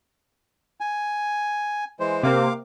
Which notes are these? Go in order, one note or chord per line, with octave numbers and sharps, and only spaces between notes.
G#5
E3 G#3 C5
C3 A#3 C4 F5 D6